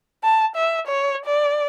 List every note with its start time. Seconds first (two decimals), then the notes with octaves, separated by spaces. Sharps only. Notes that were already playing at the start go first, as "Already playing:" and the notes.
0.24 A5
0.56 E5
0.88 C#5
1.26 D5